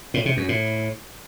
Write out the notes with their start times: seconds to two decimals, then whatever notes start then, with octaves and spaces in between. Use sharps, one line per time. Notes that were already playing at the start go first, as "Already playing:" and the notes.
0.14 A2
0.26 C3
0.37 F#2
0.49 A2